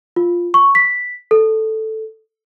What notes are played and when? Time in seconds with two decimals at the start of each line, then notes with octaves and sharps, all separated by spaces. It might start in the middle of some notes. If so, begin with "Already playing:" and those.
0.16 F4
0.54 C#6
0.75 B6
1.31 A4